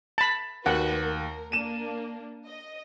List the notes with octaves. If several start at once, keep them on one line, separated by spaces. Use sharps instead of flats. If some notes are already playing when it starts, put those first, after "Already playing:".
A5 B5
D#2 A3 F#4 B4 F#5
A#4
A#3 D4 D#7 E7
D#5